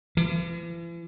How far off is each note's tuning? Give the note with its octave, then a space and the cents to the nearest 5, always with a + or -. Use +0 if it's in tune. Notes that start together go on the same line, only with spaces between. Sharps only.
E3 +45